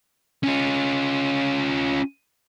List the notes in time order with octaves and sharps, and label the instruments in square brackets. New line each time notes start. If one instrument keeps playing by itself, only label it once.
[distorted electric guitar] C#4 F4